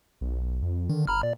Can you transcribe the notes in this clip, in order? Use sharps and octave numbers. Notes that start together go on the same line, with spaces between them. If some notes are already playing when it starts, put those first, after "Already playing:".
B1
F2
D3 D#3
G1 A#5 B5 F6
A#2 D5